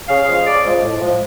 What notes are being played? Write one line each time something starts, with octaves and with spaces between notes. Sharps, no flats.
C#3 F5
F3 G#3
C#3 D5
F3 G#3
A2
F3 G#3